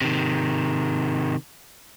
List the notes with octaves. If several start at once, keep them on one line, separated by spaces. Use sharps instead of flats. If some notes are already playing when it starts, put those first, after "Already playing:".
C3 D#3